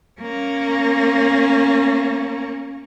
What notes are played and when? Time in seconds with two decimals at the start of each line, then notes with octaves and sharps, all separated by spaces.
0.21 A#3 C#4